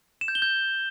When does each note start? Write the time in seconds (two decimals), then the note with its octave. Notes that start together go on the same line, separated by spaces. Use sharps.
0.21 E7
0.28 G6
0.35 G7
0.42 G6